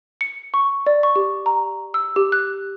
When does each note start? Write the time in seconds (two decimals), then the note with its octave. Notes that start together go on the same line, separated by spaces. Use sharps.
0.21 C#7
0.54 C#6
0.86 D5
1.03 C#6
1.16 G4
1.46 A#5
1.94 E6
2.16 G4
2.32 F#6